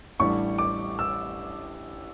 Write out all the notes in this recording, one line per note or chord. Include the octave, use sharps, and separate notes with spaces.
A1 A2 G3 D4 C#6
D6
E6